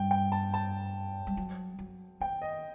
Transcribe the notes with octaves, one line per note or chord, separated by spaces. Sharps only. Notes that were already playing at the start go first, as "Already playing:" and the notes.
Already playing: G2 G5
G5
A5
A5
G3
F#3
F#3
D#3 G5
D#5